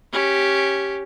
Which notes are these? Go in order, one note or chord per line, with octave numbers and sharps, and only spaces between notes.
C#4 G4